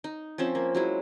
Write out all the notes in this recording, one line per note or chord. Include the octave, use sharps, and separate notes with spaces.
D#4
F3 C4 C#4 E5
A#3
F#3 G#3 E4